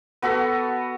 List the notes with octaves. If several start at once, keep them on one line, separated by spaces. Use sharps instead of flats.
B3 F#4 A4 B5